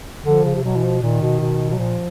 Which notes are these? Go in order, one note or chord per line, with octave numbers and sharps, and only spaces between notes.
D3 F3
C#3
C3
B2 F#3
E3
F3
A#2 D#3
B2
B2
B2 F#3
A#2 F3